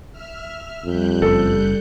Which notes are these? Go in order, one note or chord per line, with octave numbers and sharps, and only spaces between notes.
E5 F6
F2 G3 F#6 G6
F#1 A4